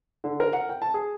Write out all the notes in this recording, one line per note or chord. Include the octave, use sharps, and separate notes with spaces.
D3
A#4
F#5
G5
A5
G#4